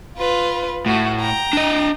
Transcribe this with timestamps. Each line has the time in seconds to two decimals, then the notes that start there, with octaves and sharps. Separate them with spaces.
0.17 F4 B4
0.86 A2 F#4
1.21 G5 A#5
1.53 D4 D#5